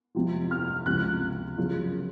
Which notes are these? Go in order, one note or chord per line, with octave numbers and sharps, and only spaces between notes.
F2 C3 F3
F6
C#2 C3 F3 F#6
F#2 C#3 F3